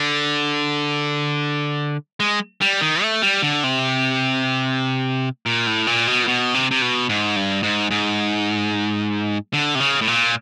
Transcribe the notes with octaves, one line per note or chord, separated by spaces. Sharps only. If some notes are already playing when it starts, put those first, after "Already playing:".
Already playing: D3
G#3
G3
D#3
A3
G3
D3
C3
A#2
A2
A#2
B2
A#2
B2
C3
C3
B2
G#2
G2
G#2
G#2
D3
C3
C#3
A2
A#2